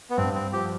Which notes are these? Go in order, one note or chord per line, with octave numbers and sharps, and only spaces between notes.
B3
G2 C4
C4
F3 G4